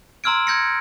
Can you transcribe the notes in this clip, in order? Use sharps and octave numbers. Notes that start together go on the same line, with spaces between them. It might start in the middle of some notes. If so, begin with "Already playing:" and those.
A#5 C6 E6 F6 G#6 D7
G6 G#6 A#6 C#7